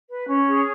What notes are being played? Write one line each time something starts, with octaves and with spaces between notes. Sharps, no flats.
B4
C#4
G#4